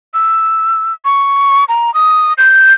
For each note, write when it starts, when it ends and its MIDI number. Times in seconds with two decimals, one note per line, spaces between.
0.14 0.93 88
1.05 1.65 85
1.69 1.93 82
1.94 2.33 87
2.38 2.74 91